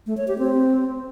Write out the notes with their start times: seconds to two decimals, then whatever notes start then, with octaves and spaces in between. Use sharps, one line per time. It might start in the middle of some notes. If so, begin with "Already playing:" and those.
0.07 A3
0.17 C#5
0.28 G4
0.39 C4